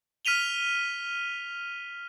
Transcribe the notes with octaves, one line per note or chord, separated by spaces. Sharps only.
F6 B6 D#7 F7 G7